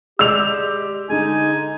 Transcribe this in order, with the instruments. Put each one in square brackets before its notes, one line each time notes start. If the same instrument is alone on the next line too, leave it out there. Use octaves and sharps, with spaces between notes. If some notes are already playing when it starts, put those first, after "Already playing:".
[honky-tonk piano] G#3 D5 D#5 [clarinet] G4 [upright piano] E6 F7
[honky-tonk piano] D3 G#3 [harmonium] D#4 [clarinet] G#5